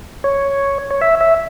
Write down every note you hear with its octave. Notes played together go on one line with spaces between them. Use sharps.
C#5
C#5
E5
E5